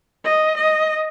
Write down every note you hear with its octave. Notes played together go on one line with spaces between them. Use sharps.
D#5
D#5